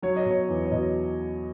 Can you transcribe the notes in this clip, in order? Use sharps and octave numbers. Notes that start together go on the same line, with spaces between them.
F#3 C#5
D#5
B2
C#5
E2
C#5
B2 D#5